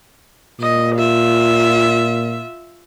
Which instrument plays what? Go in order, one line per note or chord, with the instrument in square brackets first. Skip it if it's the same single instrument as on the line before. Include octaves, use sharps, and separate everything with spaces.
[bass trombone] A#2 [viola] D#5
[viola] F4 E5